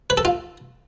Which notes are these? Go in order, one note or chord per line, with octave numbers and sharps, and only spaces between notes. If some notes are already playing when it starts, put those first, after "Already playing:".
B4
A4
F4